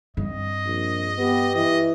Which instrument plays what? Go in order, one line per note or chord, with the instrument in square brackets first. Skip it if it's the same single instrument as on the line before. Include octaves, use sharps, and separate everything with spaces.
[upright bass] G2 C4 [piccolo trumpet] D#5
[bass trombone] A#1
[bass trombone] B3 [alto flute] G4
[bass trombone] E3 [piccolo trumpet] D#5